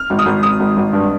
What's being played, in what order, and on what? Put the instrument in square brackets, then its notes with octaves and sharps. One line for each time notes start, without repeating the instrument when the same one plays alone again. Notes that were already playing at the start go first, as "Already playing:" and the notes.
Already playing: [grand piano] F6
[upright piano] G#1
[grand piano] D#6
[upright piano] G#1
[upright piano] G#1 [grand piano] D#6
[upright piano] G#1
G#1
G2